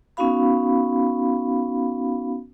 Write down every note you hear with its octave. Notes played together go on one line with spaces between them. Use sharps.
B3 C#4 D#4 F#4 F5 B5